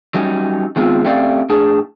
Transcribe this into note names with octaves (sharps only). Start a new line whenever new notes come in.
F#3 G3 C#4 D#4
D#3 G#3 B3 C4 F4
A3 C4 C#4 G4 D5 F5
A2 D4 G#4